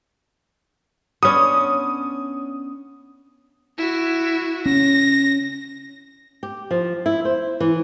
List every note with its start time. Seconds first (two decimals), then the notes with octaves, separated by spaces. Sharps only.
1.23 B3 C#4 D4 D#6
3.78 E4 F#4
4.66 C#4 A#6
6.43 G4
6.71 F3
7.06 E4
7.25 C5
7.60 E3